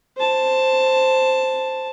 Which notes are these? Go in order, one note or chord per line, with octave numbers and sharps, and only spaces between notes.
C5 A5